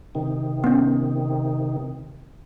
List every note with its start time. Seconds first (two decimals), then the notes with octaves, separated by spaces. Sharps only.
0.15 C3 D#3
0.64 B3 C#4